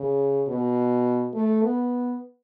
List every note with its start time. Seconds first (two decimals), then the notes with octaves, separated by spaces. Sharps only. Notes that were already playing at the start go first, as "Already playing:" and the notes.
Already playing: C#3
0.48 B2
1.34 A3
1.63 B3